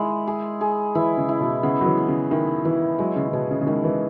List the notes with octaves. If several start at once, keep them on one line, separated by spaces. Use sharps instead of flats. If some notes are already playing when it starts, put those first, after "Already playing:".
Already playing: D#3 G#3 E4
G#4
G#4
E3 E4
C#3
E4
B2
C#3 B3
F#3
E3
B3
C#3
D#3 E4
E3 E4
F#3 G#3
C#3
C#3
B2 G#4
C#3
C#3
D#3 G#3
E3